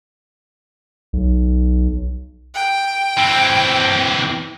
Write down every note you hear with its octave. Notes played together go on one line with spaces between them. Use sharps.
B1
G5
E3 C4